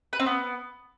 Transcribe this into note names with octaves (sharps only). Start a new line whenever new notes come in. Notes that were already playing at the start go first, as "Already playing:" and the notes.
B4
C4
B3